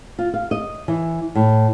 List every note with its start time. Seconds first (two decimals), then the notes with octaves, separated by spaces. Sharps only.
0.19 F4
0.34 F5
0.51 D#5
0.88 E3
1.35 A2